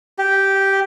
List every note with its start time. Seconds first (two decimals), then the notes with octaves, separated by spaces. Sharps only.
0.18 G4